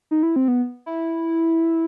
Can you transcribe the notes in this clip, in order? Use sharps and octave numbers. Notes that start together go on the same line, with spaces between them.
D#4
E4
C4
B3
E4